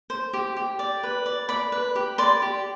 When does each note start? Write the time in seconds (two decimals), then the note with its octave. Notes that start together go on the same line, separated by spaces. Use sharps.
0.10 C5
0.33 G4
0.56 G4
0.79 D5
1.03 B4
1.26 D5
1.49 D5 B5
1.72 B4
1.95 G4
2.18 D5 C6
2.42 G4